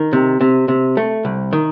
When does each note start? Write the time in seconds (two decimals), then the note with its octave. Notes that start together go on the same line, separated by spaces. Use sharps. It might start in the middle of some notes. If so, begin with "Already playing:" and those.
Already playing: D#3
0.13 C3
0.41 C3
0.68 C3
0.97 A3
1.25 C2
1.53 D#3